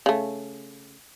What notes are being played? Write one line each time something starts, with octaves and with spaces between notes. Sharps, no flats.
C#3 A3